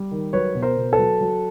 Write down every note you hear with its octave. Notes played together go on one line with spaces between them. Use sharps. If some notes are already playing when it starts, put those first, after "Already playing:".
Already playing: G3
D#3
F#3 B4 C#5
B2
A#4 C5
B2
A4 B4
F#3
F#3